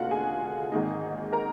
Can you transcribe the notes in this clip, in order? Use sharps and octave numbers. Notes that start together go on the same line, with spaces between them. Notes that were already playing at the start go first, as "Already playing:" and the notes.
Already playing: F1 D#2 D3 F4 F#4 F5 F#5
G#4 G#5
G#1 G#2 D#3 A#3 D#4
A#4 A#5